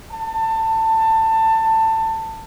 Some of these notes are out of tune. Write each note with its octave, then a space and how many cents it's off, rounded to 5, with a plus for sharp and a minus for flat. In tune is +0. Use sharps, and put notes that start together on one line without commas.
A5 +20